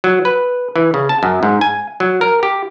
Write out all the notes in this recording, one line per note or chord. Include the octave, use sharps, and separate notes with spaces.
F#3
B4
E3
C#3
A5
F#2
G#2
G#5
F#3
A#4
G4